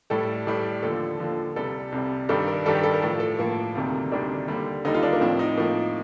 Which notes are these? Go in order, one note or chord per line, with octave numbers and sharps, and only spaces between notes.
A2 G3 A4
A2 G3
D#2 D3 F3 A4
D#2 D3 F3
C2 C3 G3 A4
C2 C3 G3
G2 D#3 G3 A4
A#4
G2 D#3 G3 A4
G4
A4
A#4
A2 F3 A4
A4
A2 F3 A#3
D2 C3 D#3 G3
D2 C3 D#3 G3 D4
D#2 D3 G3
D#2 D3 G3 D#4
F4
D4
A#3
A2 F3 C4
D#4
A2 F3 A#3